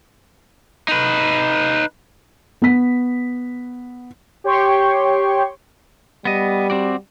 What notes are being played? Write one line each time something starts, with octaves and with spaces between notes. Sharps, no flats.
D#4 B4
B3 B6
G4 C#5 G5 C6 C#6
G3 B3 D#5
C4 F#4 D5